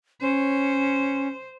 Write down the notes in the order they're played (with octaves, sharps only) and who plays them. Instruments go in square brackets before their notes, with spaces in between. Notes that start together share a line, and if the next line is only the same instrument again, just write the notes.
[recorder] C#4 [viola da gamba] C5